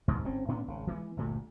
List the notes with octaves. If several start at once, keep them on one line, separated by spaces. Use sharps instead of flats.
D#2 G#2 B2
G1 G#2 C4 C#4
A2 B3 C#4 D4
G#1 C#3
E3 G#3 A#3 B3
G1 D2 A#2 A3